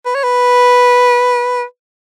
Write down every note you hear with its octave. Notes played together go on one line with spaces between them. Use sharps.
B4
C#5
B4